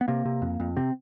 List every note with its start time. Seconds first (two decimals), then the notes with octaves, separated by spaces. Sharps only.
0.01 B3
0.08 C3 A#3
0.25 C3
0.42 F2
0.60 F2
0.76 C3 C4